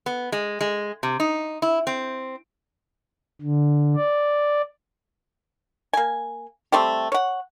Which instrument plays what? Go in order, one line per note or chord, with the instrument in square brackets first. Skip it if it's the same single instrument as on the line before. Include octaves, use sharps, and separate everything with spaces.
[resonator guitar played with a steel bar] B3
G#3
G#3
C3
D#4
E4
C4
[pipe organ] D3
D5
[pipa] A#3 G#5
G3 A3 C4 G4
C#5 F#5